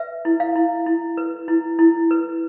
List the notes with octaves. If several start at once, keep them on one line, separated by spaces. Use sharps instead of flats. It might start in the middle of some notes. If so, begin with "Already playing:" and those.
Already playing: B4 E5
E4
F5
E4
E4
B4
E4
E4
B4